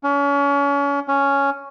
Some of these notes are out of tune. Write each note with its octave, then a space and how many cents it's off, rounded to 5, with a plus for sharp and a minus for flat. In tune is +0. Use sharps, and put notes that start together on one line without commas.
C#4 +35
C#4 +5